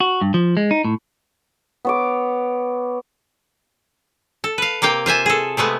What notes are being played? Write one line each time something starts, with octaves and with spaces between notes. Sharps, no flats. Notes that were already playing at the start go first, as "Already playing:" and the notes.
F#4
G2
F3
G#3
D#4
A2
B3 C#5 D6
A4
B4 F5
C3 A#3 F5 G5
F4 C5 E5 G#5
G#4 A4
C3 G#3 A3 B3